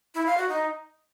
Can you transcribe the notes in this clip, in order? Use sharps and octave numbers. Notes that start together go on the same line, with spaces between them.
E4
F5
F#4
D#4